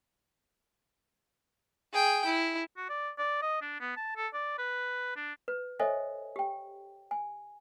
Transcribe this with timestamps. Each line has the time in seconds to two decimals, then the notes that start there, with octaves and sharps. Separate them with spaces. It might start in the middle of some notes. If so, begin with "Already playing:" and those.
1.93 G#4 G5
2.26 E4
2.77 F#4
2.89 D5
3.18 D5
3.42 D#5
3.62 D4
3.80 B3
3.97 A5
4.16 A4
4.34 D5
4.59 B4
5.16 D4
5.48 B4
5.80 A4 C5 C#5 D#5 E5 G#5
6.36 G4 G5
7.11 G#5